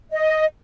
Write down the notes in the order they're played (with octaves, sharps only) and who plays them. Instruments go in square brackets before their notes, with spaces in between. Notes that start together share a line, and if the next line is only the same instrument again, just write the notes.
[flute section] D#5